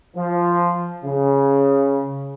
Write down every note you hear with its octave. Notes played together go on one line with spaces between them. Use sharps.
F3
C#3